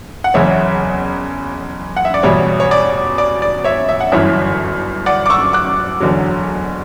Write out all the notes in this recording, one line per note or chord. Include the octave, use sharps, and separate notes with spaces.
F#5
F#1 E2 C#3 C#5 E5
F#5
E5
D5
E2 B2 G3 C#5
C#5
D5
D5
D5
C#5 E5
E5
F#5
G1 F#2 E3 C#5 E5
D5 F#5
D6
C#6 E6
D6 F#6
F#1 E2 D3 F#3